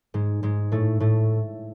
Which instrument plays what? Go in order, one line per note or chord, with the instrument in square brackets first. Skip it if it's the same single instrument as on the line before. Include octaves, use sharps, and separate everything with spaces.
[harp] G#2 G#3
G#2 G#3
A2 A3
A2 A3